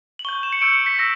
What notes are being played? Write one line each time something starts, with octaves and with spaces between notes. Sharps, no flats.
F#7
C#6 G6 G7
E7
C#7
C#6 E6 G6 D7
C#7
B6
C#6 E6 A#6